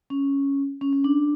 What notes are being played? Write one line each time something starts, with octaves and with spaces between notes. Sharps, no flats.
C#4
C#4
C#4
D4